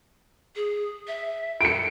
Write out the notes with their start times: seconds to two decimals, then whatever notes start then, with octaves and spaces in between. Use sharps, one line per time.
0.56 G#4
1.07 E5
1.61 A4 C#7 D7